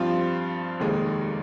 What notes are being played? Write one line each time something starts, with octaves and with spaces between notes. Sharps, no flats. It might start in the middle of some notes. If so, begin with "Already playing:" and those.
Already playing: G2 F3 C4 F4
F1 D#2 D#3 G#3